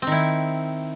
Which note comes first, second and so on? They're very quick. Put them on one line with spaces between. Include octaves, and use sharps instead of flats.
C4 D#3 E4